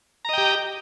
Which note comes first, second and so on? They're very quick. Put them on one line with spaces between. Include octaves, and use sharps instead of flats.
A#5 D#5 G5 G4